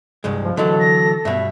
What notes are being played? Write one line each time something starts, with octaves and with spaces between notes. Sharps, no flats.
C2 G2 G#3
F3
D3 E3 F#3 A4 D#5
A#6
G2 B2 E5